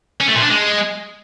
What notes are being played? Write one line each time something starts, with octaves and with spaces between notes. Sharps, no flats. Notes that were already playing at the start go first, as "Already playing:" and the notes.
C#4
A3
A#2
D4
G#3